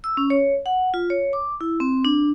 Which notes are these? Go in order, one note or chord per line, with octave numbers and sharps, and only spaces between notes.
E6
C#4
C#5
F#5
F4
C#5
D6
E4
C4
D4